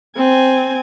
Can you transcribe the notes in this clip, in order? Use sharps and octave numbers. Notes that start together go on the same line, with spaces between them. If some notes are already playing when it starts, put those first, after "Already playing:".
C4 G#5